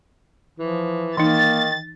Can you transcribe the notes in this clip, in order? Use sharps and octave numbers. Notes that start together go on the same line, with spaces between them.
E3 F3
D#3 E3 A#3 D#4 A6